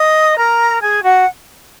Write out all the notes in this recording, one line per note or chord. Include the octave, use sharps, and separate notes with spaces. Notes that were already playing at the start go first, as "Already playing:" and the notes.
Already playing: D#5 D#6
A#4 A#5
G#4 G#5
F#4 F#5